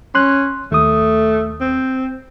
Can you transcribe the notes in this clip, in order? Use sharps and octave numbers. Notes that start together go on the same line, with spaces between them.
C#4 C6 F#6
D#2 A3 D#6
C4